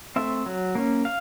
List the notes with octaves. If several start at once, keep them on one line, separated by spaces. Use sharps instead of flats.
A3 C4 E5
F#3
A#3 C#4
F5